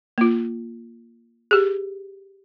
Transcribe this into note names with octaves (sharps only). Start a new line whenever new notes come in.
A#3 F4
G4 G#4